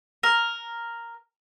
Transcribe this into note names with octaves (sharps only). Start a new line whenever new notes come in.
A#4